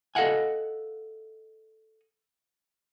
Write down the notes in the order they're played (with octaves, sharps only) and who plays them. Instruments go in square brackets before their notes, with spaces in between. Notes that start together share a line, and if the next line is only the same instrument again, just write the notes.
[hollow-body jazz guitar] A4 D#5 F5 F#5 G#5